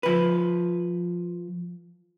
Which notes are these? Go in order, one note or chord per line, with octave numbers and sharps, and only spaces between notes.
F3 B4